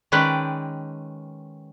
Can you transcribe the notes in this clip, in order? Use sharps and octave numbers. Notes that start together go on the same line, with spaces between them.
D#3 G#3 C#4 B4 D5 G5